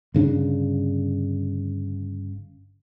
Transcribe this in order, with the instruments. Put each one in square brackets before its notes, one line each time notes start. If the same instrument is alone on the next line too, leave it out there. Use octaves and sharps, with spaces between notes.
[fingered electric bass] G1 C#3 D4